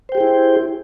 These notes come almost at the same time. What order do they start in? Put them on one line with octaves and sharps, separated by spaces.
C5 G5 G4 G#4 E4